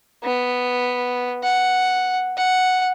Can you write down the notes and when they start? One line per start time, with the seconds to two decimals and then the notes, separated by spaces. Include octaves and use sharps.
0.24 B3
1.44 F#5
2.38 F#5